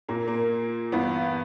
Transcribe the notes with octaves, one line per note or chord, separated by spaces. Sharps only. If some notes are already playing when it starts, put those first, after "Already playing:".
A#2 A#3
A#3
G2 E3 B3